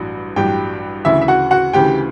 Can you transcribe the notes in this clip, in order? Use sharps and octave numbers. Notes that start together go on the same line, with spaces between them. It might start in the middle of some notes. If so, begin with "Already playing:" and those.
Already playing: A1 G2 F#3
A1 G2 F#3 G4 G5
D2 C#3 E3 E4 E5
E5
F#4 F#5
F#4 F#5
D2 C#3 E3 G4 G5